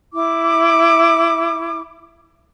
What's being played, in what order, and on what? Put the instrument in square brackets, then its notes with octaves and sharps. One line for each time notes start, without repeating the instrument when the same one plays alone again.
[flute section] E4 D6